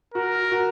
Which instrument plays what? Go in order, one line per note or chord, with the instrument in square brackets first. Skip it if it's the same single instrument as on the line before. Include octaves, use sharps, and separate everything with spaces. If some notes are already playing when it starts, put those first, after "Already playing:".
[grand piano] F#4 [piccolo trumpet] A#4
[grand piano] F#4